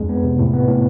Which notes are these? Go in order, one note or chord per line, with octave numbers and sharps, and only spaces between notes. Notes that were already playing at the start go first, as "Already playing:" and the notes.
Already playing: F2 G#3
B3
C3
A2
B3
A2